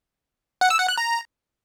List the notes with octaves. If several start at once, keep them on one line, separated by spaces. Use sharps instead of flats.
F#5
E6
F#5
F#6
A#5